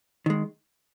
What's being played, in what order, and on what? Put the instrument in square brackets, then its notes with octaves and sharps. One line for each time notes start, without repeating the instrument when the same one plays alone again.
[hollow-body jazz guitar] D#3 G#3